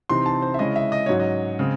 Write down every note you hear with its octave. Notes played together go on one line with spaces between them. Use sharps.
C3 E3 C4 D#4 C6
A5
C5
E5
C#3 G#3 C#4 E4 D#5
E5
D#5
G#2 F#3 C#4 C#5
D#5
C#3 G#3 C4